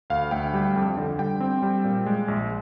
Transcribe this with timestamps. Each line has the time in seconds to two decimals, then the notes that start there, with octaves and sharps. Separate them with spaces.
0.10 D2 F5
0.31 D2 G5
0.53 G3
0.76 F2
0.97 D3
1.19 G3 G5
1.40 C4
1.63 G3
1.84 A#2
2.06 G#3
2.28 A#1